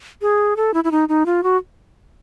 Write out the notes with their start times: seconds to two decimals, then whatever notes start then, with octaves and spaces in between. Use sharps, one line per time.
0.22 G#4
0.57 A4
0.74 E4
0.84 E4
0.91 D#4
1.09 D#4
1.26 F4
1.43 F#4